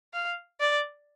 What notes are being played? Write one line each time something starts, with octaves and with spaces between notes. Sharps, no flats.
F5
D5